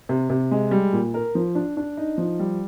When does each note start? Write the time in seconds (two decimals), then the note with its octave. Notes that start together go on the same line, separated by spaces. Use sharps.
0.09 C3
0.30 C3
0.51 G#3
0.71 G3
0.93 A#2
1.14 A#4
1.35 F3
1.55 D4
1.77 D4
1.97 D#4
2.18 F3
2.39 G3